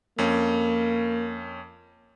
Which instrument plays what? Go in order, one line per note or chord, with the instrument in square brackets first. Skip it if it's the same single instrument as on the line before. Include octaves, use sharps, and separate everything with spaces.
[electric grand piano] F2 C#4 [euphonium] A#3